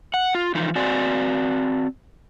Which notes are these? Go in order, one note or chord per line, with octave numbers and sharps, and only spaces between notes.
F#5
F4
E3 F3 D#4
C4 F#4 D5 G#5